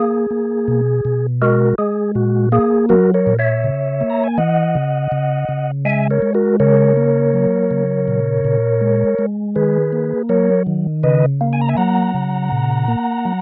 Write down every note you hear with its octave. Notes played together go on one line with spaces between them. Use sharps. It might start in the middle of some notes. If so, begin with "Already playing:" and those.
Already playing: A#3 G#4
A#3
B2
B2
G#3 F#4 A#4
G#3 G#4
A#2 F#4
A#3 G#4
F#3 F#4 A#4
A#4 C#5
A#2
C#5 E5
C#3
A#3
A#5
G#5
E3 D#5 F#5
C#3
C#3
C#3
G#3 E5 G#5
A#4 C#5
G#3
F#4 A#4
C#3 A#4 C#5
A#3
F#3
C#3
A#2
A#2
G#3
G#3
D#3 G#4 B4
A#3
F#3 A#4 C#5
D#3
C#3 B4 D#5
A#3
G#5
A#5
E5 G#5
F#3 F#5 A#5
C#3
A#2
A#3
F#3